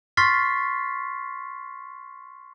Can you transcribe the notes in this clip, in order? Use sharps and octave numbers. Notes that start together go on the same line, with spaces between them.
C6 C#6 F6 A6 B6 C7